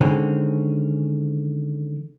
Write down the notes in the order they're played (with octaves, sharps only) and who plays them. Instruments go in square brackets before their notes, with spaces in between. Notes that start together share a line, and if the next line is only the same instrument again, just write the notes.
[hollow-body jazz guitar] D3 D#3 G#3 C4 C#4